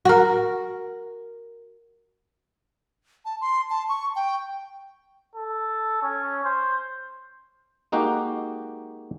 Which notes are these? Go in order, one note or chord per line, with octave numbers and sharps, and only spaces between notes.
F#4 A#4
A5
C6
A5
C#6
G5
A4
C#4
C5
G#3 A#3 D#4 F#4 G4